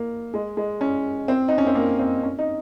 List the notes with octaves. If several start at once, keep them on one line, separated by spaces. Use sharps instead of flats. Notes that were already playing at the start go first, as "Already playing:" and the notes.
Already playing: A#3
G#3
G#3
C#4
C4
D#4
C#4
C4
A#3
C4
C#4
D#4